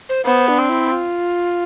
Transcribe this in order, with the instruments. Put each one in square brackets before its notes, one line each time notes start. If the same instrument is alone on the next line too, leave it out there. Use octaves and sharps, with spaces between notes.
[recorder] C5
[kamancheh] B3 [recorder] C5
[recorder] D4
[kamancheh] C4
[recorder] E4
F4